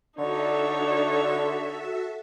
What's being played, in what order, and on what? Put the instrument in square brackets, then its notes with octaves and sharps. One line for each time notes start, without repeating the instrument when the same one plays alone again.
[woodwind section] D3 [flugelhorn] D4 [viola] D#4 C#5 [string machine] F#4 A4 E5